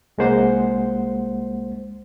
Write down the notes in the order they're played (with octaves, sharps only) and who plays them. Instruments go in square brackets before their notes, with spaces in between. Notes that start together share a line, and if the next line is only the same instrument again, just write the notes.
[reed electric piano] C2 G#3 A#3 C5 F#5 C6